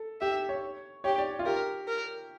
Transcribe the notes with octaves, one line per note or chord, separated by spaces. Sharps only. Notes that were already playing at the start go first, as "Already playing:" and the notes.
Already playing: A4
G4 E5
C#5
G4 C#5
D5
F4
G4 A#4
A#4